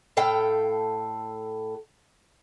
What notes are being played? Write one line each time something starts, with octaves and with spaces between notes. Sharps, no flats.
A2 A4 F5 G5